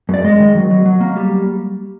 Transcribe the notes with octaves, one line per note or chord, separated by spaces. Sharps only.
F#2 D5
G#3 D#5
D#3
F#3
F#3
F#3
A#3
G3